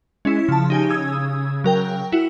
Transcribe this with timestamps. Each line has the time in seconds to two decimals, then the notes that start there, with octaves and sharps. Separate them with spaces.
0.25 G#3 C#4 E4
0.49 C#3 F3 A5
0.70 D#4 G4 G#5
0.90 D#6 E6 G#6
1.64 F#3 A#4 G5
2.12 E4 F#4